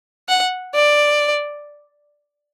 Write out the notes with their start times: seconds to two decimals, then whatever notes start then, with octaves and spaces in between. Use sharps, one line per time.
0.28 F#5
0.75 D5